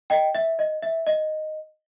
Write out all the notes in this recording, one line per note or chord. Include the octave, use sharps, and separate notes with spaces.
D#5 G5
E5
D#5
E5
D#5